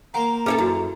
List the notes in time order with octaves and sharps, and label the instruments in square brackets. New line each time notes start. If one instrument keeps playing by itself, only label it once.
[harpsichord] A#3 C5 F5 [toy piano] F#5 G#5 [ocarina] A#5
[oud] C#4 E4 A4 [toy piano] G#4 B4
[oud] F#2 [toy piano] E4 F#4